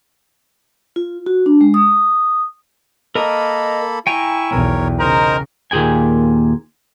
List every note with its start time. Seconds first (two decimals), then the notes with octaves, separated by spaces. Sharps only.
0.96 F4
1.26 F#4
1.46 D4
1.61 G#3
1.74 D#6
3.15 A#3 A4 A#4 D#5 A#5 B5
4.07 E4 G5 G#5 A#5 C#6
4.51 B1 E2 A#4 C#5
5.00 C#3 D#4 A#4 C5 D#5
5.71 D#2 A#2 G#4 G5 G#5